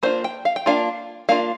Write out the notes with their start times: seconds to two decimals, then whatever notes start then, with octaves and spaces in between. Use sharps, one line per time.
0.03 A#3 D4 F4 C5
0.24 G5
0.45 F5
0.56 G5
0.66 A#3 D4 F4 F5
1.29 A#3 D4 F4 F5